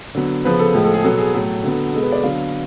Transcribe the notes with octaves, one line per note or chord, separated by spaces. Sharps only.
D3 F#3 B3
C#3 F3 B3 B4
A4
A2 F3 G#3
A4
G#4
B2 F#3 B3 A4
G#4
A2 F#3 A3 A4
D3 F#3 B3
B2 G#3 B3 A4
B4
D5
D3 F#3 B3 F5